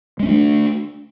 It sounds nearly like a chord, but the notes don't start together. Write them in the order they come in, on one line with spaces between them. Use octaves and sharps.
G#3 C#4 A3 D4